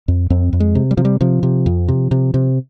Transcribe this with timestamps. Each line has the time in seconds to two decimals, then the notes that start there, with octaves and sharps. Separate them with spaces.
0.08 F2
0.30 F2 C4
0.53 F2
0.60 G#3
0.75 C3
0.91 G3
0.97 C3 F3
1.05 G3
1.21 C3 F3
1.43 C3
1.66 F2
1.88 C3
2.11 C3
2.34 C3